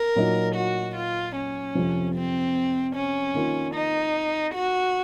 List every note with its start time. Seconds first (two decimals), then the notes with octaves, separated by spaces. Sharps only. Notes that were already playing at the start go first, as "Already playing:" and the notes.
Already playing: A#4
0.16 A#2 F#3 A#3 D#4
0.55 F#4
0.95 F4
1.36 C#4
1.75 F2 C3 F3
2.15 C4
2.95 C#4
3.34 D#3 A#3 F4
3.75 D#4
4.54 F#4